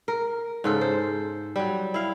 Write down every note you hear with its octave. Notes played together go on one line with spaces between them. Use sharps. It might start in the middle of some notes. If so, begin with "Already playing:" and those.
A#4
G#2 C#3 A4
C5
F#3 G3
E4 F5